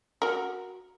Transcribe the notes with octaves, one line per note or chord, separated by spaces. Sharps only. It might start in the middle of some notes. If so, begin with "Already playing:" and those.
F#4 A#4